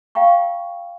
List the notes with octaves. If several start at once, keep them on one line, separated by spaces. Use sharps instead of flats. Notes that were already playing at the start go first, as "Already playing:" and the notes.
F5 G5 A#5 C#6